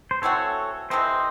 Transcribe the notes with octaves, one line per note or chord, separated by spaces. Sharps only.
C5
E3 A3 C4 F#4 A4 C#5
C3 E3 A3 C4 C5 D#5